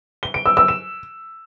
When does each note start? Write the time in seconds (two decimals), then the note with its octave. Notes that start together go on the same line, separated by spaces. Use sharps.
0.23 G7
0.34 D7
0.46 E6
0.57 E6
0.68 E7